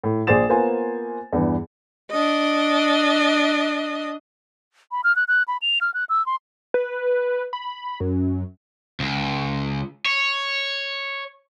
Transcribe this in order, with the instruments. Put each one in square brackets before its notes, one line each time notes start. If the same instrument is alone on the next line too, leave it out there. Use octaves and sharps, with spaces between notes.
[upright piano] A2
A#1 G#4 C5 D5 A6 E7
A#3 B3 F4 C5 G#5
E2 G2 E3
[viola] D4 D#5
[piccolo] B5
F6
F#6
F#6
B5
F7
F6
F#6
E6
C6
[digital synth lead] B4
B5
F#2
[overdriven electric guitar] C#2
C#5